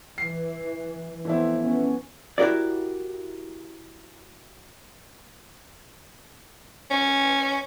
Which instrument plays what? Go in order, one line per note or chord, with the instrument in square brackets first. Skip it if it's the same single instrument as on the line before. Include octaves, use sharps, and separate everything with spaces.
[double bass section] E3 [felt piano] C7
[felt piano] E3 A3 E4 [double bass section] F3 B3 C4
[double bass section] B3 C#4
[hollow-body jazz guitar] E4 F#4 G4 A#4 D5
[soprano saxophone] C#4